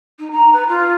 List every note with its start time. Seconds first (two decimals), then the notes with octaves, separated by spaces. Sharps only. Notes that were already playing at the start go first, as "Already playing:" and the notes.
0.19 D#4
0.31 A#5
0.52 B4
0.68 F4